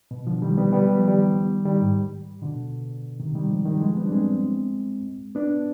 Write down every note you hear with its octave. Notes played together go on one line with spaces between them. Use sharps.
B2
D3 F3
D#3 G3
G3 B3
G3 B3
G3
F3
D#3 G3
D#3 G3
G#2
B2 D3
C3 D#3
D#3 G3
F3 G#3
D#3 G3
F3 G#3
G3 B3
D4
G#3 C4
B3 D4